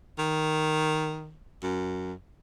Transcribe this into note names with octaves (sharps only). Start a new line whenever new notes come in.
D#3
F#2